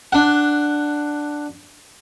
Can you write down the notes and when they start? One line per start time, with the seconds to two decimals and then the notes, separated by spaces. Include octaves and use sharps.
0.12 D4 F#5